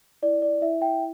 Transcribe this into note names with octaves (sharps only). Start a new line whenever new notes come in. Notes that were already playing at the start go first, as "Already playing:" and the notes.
E4 D5
D5
E4 E5
E5 G5